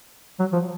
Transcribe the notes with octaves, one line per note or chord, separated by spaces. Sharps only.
F#3
F3